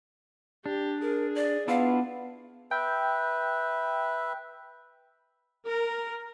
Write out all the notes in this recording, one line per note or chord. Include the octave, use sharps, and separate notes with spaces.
D4 G4
G#4 A#4
D5
B3 D4 E4 F4 F5
B4 E5 G5
A#4